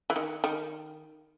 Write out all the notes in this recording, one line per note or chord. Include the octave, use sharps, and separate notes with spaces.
E3
D#3
D#3